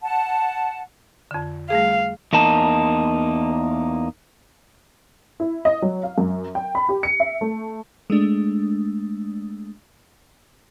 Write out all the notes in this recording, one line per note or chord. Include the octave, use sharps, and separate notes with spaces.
F#5 A5
F2 D3
G3 A3 G#4 F5
E2 A#3 D#4 A5
E4
D#5
F#3
F5
F#2
G5
B5
G4
C#7
E5
A3
G#3 A3 D4